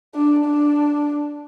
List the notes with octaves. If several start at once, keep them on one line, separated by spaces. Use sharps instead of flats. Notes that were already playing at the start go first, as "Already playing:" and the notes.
D4
D4